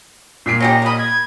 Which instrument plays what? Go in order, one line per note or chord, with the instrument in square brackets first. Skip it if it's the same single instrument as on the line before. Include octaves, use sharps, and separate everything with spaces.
[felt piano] A#2 B6 D7 [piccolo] C7
[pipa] C#4 D#4 G4 [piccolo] A#6
[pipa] A#4 B5 [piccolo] D#5
[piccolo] G#6